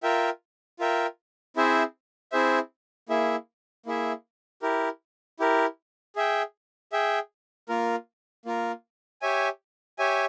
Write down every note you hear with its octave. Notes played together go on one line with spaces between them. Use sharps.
F4 A#4 E5 G5
F4 A#4 E5 G5
C4 E4 G#4 C5 E5
C4 E4 G#4 C5 E5
A#3 E4 G#4 E5
A#3 E4 G#4 E5
E4 G4 A#4
E4 G4 A#4
G#4 E5 G5
G#4 E5 G5
A#3 F4 A#4
A#3 F4 A#4
G4 C#5 E5 G#5
G4 C#5 E5 G#5